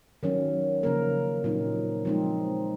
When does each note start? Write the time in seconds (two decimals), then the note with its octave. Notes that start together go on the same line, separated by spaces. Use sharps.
0.23 D#3 F#3 C#4
0.83 C#3 F3 A#3 A#4
1.44 A#2 F#3 C4 D#4
2.05 F3 G#3 C4 D#4